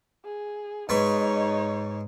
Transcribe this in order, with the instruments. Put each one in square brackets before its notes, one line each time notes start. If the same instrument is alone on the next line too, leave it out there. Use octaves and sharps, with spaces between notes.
[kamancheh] G#4
[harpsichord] G#2 B4 C#6 [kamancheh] D#4 C#5